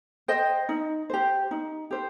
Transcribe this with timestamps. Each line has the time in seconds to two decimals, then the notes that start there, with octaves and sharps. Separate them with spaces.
0.28 C5 D#5 G5
0.69 D#4
1.10 G4 C5
1.51 D#4
1.91 G4 C5